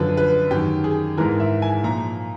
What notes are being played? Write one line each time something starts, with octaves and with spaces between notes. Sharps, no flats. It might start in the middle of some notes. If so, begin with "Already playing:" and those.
Already playing: F#2 D3 F3 B4
B4
F#2 D#3 G4
G#4
G#2 E3 A#4
E5
G#5
A#2 F3 A#5